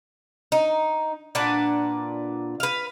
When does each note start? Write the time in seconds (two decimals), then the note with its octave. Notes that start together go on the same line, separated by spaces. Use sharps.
0.52 D#4
1.35 A#2 D4 B4 F#5
2.60 B4 F5